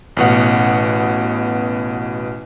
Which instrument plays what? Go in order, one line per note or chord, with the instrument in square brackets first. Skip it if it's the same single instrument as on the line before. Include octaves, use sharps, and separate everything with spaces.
[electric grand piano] A1 B2 F#5